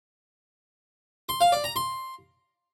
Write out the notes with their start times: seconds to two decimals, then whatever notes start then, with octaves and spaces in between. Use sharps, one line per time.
1.29 C6
1.41 F5
1.52 D5
1.64 A#5
1.76 C6